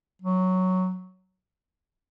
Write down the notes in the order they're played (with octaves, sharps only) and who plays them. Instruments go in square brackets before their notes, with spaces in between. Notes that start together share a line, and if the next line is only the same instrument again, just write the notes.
[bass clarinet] F#3